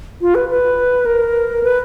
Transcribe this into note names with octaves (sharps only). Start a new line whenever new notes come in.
F4
B4
B4
A#4
B4